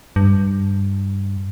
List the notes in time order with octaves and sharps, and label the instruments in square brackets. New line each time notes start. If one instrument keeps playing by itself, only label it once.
[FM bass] G2